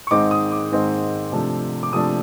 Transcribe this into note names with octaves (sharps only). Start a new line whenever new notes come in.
C#6
G#2 D#3 G#3 C4 D#4 D6
D#6
D6
G#2 D#3 G#3 C4 D#4
C3 F3 A3 D4
D6
C3 F3 A3 D4 D#6